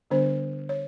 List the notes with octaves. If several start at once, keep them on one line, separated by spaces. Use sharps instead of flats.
D3 G3 B3 D4 C5
C#5